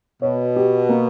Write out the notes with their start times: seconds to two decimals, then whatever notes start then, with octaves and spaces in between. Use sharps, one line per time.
0.22 B2 C#5
0.56 G4
0.89 A#3